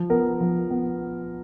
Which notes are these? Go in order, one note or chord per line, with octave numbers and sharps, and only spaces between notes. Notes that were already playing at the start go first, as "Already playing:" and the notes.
Already playing: F3
B3 A#4
F3
B3